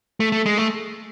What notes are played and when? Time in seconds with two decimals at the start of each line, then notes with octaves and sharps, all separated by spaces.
0.20 A3
0.32 A3
0.46 G#3
0.58 A3